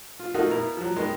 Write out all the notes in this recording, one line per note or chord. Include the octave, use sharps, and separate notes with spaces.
F4
A3 A#3 D#4 F4 F#4
B2 A#3 E4 A#5
F3 F#3
B2 D#3 G#3